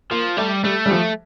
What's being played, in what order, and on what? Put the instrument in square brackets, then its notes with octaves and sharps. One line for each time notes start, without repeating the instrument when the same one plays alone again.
[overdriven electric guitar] F3 [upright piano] A#3
[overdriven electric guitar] G3 [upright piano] A3
[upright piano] G3 [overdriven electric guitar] A3
[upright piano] G3
F3